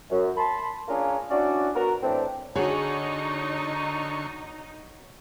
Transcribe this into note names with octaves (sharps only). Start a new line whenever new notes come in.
F#2
A5 B5 C6
A#3 C#4 D4 F4 G#4 A#4
C#4 D4 E4 F#4 D5
B3 F#4 A#4
A2 E3 C4 D4
D3 D#4 F#4 G#4 C#5 C#6